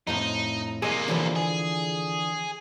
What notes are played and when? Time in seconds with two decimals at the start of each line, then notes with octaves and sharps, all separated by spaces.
0.07 F2 A2 D#4 C5
0.82 C3 A#3 G#4 D#5
1.08 D3 E3 F3
1.36 G#4